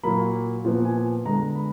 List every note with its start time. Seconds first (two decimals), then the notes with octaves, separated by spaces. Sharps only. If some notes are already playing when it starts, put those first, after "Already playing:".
0.04 A#2 F#3 A#3 B5
0.65 A#2 F3 B3
0.85 G#5
1.24 D3 G#3 B3 A#5
1.55 B5